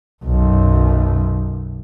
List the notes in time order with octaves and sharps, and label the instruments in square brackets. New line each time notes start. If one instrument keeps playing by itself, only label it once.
[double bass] B1 F#2